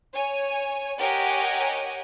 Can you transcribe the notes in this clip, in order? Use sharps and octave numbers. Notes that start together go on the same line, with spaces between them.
C#5 G#5
G4 A#4 C#5 D#5 F#5 G#5